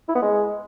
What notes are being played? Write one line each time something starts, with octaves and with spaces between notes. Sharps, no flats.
E4
B3
G#3